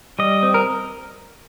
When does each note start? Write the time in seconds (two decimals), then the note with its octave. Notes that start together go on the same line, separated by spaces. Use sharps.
0.19 G3 D#5
0.43 C4
0.54 A#4